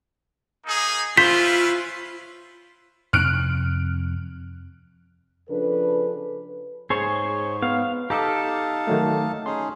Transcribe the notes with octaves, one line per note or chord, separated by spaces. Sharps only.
A#3 D#4 G#4
C#4 E4 F4 B4 C5 B6
F2 C3 C4 F6 F#6 D7
C#3 F3 D4 A4 B4
G#2 G#4 C5 C#5
B3 F5
D#4 G4 A4 F5 A5 A#5 D6
D#3 F#3 A3
C#4 D#4 G#4 C6